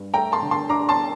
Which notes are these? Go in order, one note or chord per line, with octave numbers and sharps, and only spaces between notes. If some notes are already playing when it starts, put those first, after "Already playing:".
Already playing: G2
A3 G5 A#5
A5 C6
D3
A5 C6
D4 A#5 D6
A5 C6